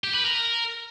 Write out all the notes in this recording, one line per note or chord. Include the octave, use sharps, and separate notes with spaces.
G4
B4
A#4